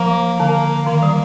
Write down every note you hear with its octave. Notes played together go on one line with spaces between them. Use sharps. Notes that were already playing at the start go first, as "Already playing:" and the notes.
Already playing: F3 A#3
D3 A#3
D#3 A#3
G3